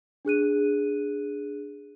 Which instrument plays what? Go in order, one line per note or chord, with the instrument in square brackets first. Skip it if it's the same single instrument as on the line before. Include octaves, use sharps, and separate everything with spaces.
[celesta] D4 G#4 F#6 D#7